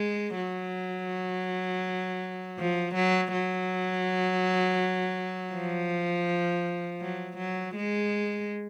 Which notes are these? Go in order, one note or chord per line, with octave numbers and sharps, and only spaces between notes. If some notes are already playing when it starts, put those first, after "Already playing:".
Already playing: G#3
F#3
F3
F#3
F#3
F3
F#3
F#3
G#3